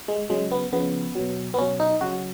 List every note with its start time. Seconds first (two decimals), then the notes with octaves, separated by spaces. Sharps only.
0.08 G#3
0.30 C#3 F#3 G#3
0.51 B3
0.73 C#3 F3 B3
1.15 B2 F#3
1.54 B3
1.58 B2 F#3 C#4
1.80 D#4
2.01 C#3 F#3 F#4